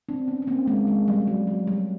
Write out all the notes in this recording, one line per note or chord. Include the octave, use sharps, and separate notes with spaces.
C4 D4
B3 C#4
C#4
A#3 C4
G#3 A#3
G#3
G3
F#3
F#3
G3